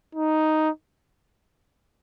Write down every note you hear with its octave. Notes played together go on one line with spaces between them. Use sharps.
D#4